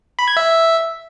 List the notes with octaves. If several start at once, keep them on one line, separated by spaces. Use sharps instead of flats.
B5
G#6
E5